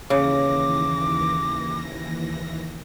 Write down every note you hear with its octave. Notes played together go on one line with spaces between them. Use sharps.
D#2 C#3 E3 D6 A#6